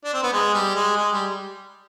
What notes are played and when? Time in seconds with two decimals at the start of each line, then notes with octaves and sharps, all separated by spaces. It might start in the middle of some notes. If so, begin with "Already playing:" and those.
0.04 D4
0.14 C4
0.23 B3
0.33 G#3
0.53 G3
0.75 G#3
0.96 G#3
1.12 G3